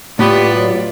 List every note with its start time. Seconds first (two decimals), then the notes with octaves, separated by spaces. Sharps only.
0.19 A2 B3 F4 G4 D5
0.55 F#3